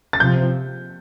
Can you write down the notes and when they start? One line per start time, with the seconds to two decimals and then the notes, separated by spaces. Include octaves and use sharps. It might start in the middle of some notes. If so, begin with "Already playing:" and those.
0.13 A6
0.20 C3 F3 C4 G6